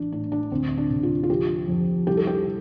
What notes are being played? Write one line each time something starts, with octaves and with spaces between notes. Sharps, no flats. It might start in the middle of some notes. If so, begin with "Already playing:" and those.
Already playing: A1 D4
A2 D4
D4
D2 C4
D4
C3
F4
F4
F3 G4
F2
C2 G4
A4
G4